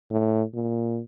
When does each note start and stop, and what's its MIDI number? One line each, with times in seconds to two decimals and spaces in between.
0.10 0.43 45
0.54 1.00 46